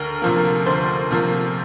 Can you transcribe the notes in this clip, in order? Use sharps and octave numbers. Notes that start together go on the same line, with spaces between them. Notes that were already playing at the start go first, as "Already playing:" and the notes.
Already playing: D2 A#4
C3 F3 A#3
D2 C5
C3 F3 A#3